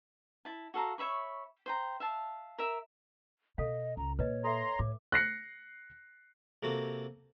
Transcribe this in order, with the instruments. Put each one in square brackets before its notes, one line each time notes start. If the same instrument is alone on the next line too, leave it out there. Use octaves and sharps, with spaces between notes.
[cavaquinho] E4 A5
F#4 A4 F5 A#5
C#5 E5 B5 C#6
C5 G5 A#5
E5 F5 A5
A#4 E5
[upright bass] B2 [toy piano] A4 F5 [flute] D#5
[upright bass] C#2 [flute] A#5
[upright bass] A#2 [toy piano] B4 D#5 [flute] C#5
[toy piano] A4 E5 [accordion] A#5 C6
[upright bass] A2 [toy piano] D6
[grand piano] F#6 A#6 C7 C#7
[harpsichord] C3 A#3 F#4 A4